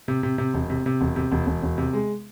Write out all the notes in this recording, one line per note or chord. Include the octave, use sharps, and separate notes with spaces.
C3
C3
C3
E1
C3
C3
E1
C3
E1
E1
E1
C3
G#3